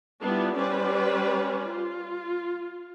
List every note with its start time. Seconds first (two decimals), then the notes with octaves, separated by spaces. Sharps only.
0.22 G3 B3 D4 E4 F4
0.56 G3 C#4 B4 C5 D5
1.67 F4